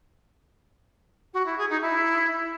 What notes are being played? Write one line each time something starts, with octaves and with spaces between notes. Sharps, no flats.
F#4
E4
G#4
D#4
E4